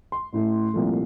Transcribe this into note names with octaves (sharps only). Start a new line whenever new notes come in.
C6
A1 A2 A3
C2 A#2 F3 A3